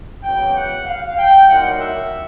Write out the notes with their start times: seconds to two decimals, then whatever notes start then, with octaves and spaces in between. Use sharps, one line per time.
0.23 E2 C#3 F#3 G5
0.55 F#5
0.86 F5
1.17 G5
1.48 C2 A#2 F#3 A#3 D#4 F#5
1.80 E5